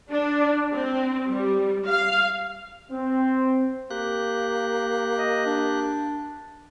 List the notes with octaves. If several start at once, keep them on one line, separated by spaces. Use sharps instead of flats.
D4
C4
G3
F5
C4
A#3 G4 F#6
D#5
D4